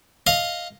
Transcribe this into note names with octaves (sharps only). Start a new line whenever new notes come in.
D#5 F5